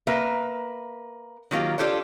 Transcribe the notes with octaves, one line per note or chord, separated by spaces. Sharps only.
A#3 A#4 B4 E5
D#3 F#3 A#3 F4 G4
D4 F4 G4 A4 C5 C#5